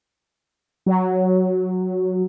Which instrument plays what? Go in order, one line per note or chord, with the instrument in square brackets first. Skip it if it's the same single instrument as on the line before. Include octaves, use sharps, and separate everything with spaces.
[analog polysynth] F#3